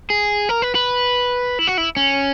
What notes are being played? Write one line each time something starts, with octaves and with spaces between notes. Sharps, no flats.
G#4
A#4
B4
B4
E4
F#4
E4
C#4